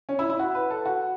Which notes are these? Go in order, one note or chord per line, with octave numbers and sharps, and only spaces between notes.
C#4
E4
E4
F#4
B4
A4
F#4